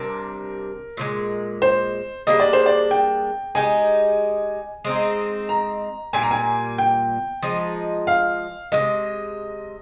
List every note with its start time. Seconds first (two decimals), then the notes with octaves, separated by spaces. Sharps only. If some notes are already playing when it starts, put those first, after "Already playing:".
Already playing: C3 G3 D4 A#4
0.97 A#2 F3 G#3
1.62 C5
2.27 G3 A#3 D4 G#4 D#5
2.40 D5
2.53 C5
2.66 D5
2.91 G5
3.55 G#3 D#4 G4 G#5
4.85 G#3 C4 D#4
5.49 A#5
6.13 A#2 G3 A#3 G#5
6.23 A#5
6.31 G#5
6.78 G5
7.42 F3 G#3 D#4
8.07 F5
8.72 C3 F3 G#3 D#5